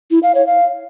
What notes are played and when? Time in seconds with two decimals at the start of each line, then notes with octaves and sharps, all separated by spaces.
0.11 E4
0.23 F5
0.35 C#5
0.47 F5